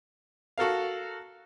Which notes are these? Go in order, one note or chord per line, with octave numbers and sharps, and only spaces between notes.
F#4 A4 A#4 F5